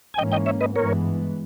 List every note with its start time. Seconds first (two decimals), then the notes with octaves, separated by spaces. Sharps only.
0.14 G#5
0.18 G#2 E3 A#3 C#4 D#5 G5
0.32 D#5 G5
0.46 C#5 E5
0.61 B4 D#5
0.75 G2 E3 G#3 B3 A#4 C#5